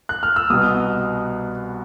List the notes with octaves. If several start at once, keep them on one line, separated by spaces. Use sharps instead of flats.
F#6
F6
E6
C2 B2 D#6